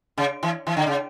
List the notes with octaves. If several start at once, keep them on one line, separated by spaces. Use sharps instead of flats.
C#3
E3
E3
D3
C#3